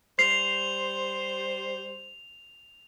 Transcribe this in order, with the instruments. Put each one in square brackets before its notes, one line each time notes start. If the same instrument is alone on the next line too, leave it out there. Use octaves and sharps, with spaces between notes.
[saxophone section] G3 C5 [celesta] C7 [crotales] F7